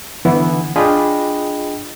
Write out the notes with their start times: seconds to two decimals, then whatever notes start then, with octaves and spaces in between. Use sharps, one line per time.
0.25 D3 E3 B3 E4
0.76 D4 F4 G#4 D#5 G5 B5